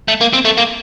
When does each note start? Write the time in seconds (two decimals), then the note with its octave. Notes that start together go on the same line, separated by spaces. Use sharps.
0.08 A3
0.21 A#3
0.33 C4
0.45 A3
0.57 A#3